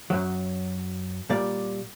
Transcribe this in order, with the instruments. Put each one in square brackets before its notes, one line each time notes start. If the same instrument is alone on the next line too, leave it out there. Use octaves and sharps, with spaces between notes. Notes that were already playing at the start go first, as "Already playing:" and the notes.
[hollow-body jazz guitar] F#2 F#3
A#2 G3 D5